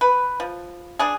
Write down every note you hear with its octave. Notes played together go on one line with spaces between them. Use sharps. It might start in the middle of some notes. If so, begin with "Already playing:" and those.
B4
F3
D4 G#4